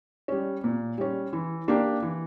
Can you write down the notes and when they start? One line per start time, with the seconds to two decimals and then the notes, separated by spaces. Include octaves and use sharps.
0.28 G3 C#4
0.64 A#2
0.98 G3 C#4
1.33 E3
1.68 A#3 D4 G4
2.02 E3